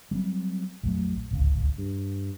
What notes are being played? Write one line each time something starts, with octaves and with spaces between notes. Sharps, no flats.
F#3 G3 C4
A#1 F2 F#3 A3
D1 G#1 C#2 C#3
G2